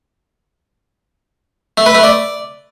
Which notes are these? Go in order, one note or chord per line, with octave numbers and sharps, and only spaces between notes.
A3
B4
A3
D5